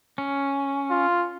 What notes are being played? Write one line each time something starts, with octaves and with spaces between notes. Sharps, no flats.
C#4
F4